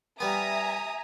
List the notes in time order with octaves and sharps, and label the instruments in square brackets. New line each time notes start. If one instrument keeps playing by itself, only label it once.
[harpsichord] G3 B3 [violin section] E5 G#5 A#5 [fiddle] D#6